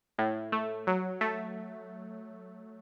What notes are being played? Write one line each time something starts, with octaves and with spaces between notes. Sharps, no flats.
A2
A3
F#3
A3